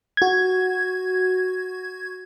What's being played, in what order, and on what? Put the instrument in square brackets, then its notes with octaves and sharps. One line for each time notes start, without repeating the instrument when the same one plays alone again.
[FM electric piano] F#4 G#6